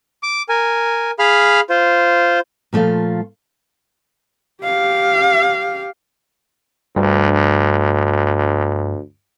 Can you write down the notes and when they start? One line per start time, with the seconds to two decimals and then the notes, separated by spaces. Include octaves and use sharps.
0.23 D6
0.49 A#4 G#5
1.19 G#4 F5 B5 F6
1.70 F4 C5
2.73 A#2 F3 A3 F4 F5
4.63 G4 F5
6.96 D2 G2